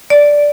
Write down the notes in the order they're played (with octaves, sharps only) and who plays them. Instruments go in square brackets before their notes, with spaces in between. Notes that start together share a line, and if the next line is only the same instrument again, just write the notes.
[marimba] D5